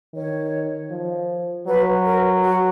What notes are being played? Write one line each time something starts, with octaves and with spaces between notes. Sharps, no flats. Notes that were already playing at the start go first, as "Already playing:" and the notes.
D#3 C#5
F3
F#3 B4
A#4
F#4